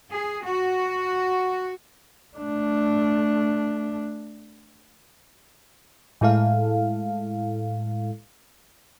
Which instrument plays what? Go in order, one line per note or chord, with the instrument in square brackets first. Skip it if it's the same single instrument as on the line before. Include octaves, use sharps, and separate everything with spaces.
[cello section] G#4
F#4
[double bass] A3 D4
[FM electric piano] A2 G#3 E4 A4 F5